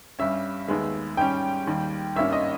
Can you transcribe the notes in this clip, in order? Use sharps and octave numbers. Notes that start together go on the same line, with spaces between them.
G2 G3 C#4 E5
D#2 D#3 G#3 B3
G#2 G3 C#4 G5
D#2 D#3 G3
G#1 G2 D#3 A#3 C#4 E5
D#5